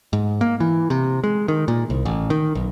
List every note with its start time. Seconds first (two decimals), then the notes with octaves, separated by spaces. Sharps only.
0.13 G#2
0.41 A#3
0.60 E3
0.90 C3
1.24 G#3
1.48 D#3
1.68 A#2
1.90 C2
2.05 A1
2.30 D#3
2.55 B1